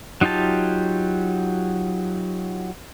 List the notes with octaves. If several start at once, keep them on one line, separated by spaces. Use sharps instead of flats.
F#3 D#4 F4 G4 A5